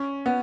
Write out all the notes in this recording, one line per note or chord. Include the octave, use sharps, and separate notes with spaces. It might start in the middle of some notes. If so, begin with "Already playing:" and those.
Already playing: C#4
B3